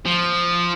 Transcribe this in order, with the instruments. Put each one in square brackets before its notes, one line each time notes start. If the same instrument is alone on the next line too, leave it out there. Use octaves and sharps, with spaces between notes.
[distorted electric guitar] F3